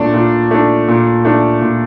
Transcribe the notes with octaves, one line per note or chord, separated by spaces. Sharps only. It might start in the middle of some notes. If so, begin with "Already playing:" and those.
Already playing: A#2 A3 D4
A#2
A3 D4
A#2
A3 D4
A#2